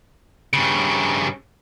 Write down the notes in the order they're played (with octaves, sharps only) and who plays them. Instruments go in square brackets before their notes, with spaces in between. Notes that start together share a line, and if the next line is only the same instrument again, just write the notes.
[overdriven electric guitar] G2 C#3